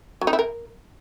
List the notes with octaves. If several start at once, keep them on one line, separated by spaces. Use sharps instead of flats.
F#3
D#4
E4
A#4